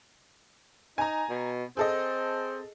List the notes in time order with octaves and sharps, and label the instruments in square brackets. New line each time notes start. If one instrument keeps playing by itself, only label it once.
[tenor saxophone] D#4 [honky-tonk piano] G#5 A#5
[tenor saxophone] B2
[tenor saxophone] C4 [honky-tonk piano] G#4 A4 D#5